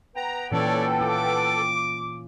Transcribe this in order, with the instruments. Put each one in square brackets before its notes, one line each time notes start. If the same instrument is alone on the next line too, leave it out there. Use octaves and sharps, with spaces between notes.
[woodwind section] B3 B4 G5 [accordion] A#5
[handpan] A#2 E3 C#4 [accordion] A4 [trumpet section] C#5 D5
[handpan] F4 [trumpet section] D6